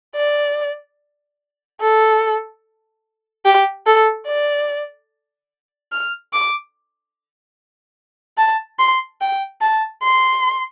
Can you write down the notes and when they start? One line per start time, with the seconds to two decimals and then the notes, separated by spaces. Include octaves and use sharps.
0.15 D5
1.80 A4
3.45 G4
3.86 A4
4.26 D5
5.91 F6
6.33 D6
8.38 A5
8.79 C6
9.21 G5
9.61 A5
10.03 C6